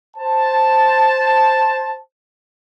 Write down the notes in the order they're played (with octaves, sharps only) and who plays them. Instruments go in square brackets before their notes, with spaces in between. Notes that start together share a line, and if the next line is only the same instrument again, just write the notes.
[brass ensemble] C5 A5